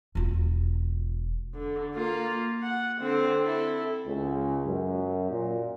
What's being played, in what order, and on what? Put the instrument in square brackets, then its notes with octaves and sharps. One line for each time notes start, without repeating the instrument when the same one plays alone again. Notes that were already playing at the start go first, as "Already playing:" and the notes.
[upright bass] E1 F4
[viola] D3
A#3 F4
F#5
D3 C4
E4 A4
[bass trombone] C#2
F#2
A#2